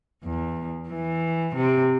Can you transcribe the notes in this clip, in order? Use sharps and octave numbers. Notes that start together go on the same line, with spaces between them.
E2
E3
C3